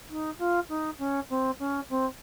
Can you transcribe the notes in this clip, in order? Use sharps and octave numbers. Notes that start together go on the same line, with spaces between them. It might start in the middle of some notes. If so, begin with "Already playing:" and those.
D#4
F4
D#4
C#4
C4
C#4
C4